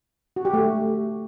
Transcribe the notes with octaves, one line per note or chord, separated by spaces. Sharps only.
F#4
G4
A3